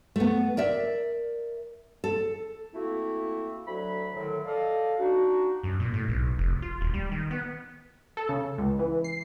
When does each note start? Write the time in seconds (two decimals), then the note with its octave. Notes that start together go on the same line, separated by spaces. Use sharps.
0.16 A3 B3
0.57 A#4 D5 E5
2.04 A4
2.74 A3 A#3 C4 E4 F#4
3.65 D2 F#3 B5
4.13 A2 D3 D#3 F#3
4.45 A4 D5 D#5 F5
4.99 D4 D#4 F#4
5.63 F#2
5.80 A#2
5.94 A2
6.08 B1
6.38 F1
6.62 F4
6.81 D#1
6.94 G3
7.11 D#3
7.31 B3
8.17 A4
8.29 C#3
8.58 C#2
8.79 E3
9.04 C7